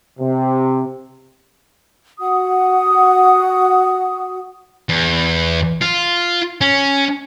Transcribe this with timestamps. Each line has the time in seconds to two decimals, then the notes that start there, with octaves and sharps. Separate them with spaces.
0.19 C3
2.19 F#4 F#5 D#6
4.89 E2
5.82 F4
6.61 C#4